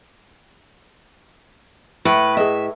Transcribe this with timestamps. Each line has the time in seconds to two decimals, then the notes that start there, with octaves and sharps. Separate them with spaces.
2.05 A2 B4
2.37 G#4 B4 D#5 E5